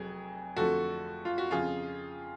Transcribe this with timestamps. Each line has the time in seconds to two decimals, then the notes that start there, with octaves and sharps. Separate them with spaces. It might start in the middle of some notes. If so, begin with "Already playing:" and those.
Already playing: F1 F2 F#3 G#4
0.56 F2 D3 F3 A3 F#4 A4
1.25 F4
1.38 F#4
1.51 F2 C#3 F3 F4 G#4